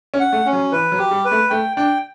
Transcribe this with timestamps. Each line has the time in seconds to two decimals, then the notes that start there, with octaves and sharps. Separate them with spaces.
0.14 C#4
0.20 F#5
0.33 A3
0.46 C#4
0.53 F#3
0.72 E3 B4
0.92 F#3
0.99 G4
1.11 G3
1.25 B4
1.31 A3
1.50 A3 G5
1.77 D4 G5